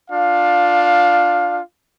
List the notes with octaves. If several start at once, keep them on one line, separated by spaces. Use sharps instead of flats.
D4 F4 F5